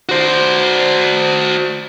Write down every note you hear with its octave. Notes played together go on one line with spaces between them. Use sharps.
F#4 C5